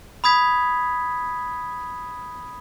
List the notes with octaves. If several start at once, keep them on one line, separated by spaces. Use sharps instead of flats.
B5 D#6 G#6 B6